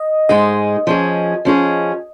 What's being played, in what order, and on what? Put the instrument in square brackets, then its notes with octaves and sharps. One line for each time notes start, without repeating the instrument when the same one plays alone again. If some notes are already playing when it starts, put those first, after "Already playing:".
Already playing: [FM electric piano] D#5
[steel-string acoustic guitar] G#2 G#3 D#4 G#4 [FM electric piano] D#5
[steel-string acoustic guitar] F3 C#4 G#4
F3 C#4 G#4